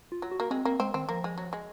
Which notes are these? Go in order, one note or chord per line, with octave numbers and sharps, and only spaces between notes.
F4
F#3
F#4
A#3
G#3 C4
A#3 C4
G#3 C4
D#3 C4
F3 A#3
G#3
F#3
G#3